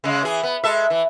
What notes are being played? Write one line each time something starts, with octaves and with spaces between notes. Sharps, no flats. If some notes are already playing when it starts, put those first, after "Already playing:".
C#3 G#3
E3 G#4
B3
G#3 A4 E5
E3